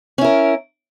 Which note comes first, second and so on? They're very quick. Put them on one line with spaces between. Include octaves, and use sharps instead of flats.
C#4 E4 A#4